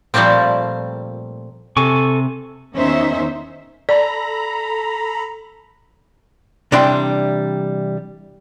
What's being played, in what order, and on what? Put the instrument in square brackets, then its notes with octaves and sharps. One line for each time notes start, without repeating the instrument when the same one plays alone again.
[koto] A#2 F3 G3 A3 A#3 C4
[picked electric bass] C3 [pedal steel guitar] A4 G#5 C#6
[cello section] E2 D#3 C#4 D#4 C5 E5
[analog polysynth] A4 A#5 B5 [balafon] D5
[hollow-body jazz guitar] C3 E3 G3 D4 G5 C6